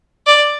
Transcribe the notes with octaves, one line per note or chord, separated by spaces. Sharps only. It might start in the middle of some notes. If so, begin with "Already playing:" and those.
D5